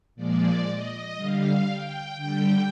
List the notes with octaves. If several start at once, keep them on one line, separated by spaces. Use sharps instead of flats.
A#2 F3 G#3 D5
D#5
D3 G3 F5
G5
D3 G3 G5